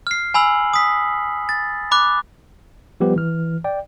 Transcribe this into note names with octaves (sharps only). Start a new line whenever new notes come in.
F6 C7
G#5 B5 E6 F#7
D#6 B6
A6
B5 D6 F#6
F3 G3 B3 G4 B4
E3 F6
D5 G5